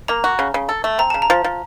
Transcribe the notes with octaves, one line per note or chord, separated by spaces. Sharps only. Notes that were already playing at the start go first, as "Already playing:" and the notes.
A#3 A#5
F#4
C#3
C#3
A4
A3
C4 A#5
C#3 A5
A#5
F3
F3